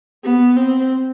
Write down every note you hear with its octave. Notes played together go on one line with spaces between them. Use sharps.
B3
C4